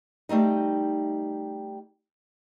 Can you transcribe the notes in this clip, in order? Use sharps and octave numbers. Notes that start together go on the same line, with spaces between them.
G3 A3 C4 D#4